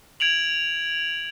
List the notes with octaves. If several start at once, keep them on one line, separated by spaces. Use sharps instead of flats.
G#6 D7 F7 F#7